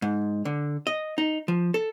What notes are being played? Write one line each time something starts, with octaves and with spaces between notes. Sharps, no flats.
G#2
D3
D#5
D#4
F3
A4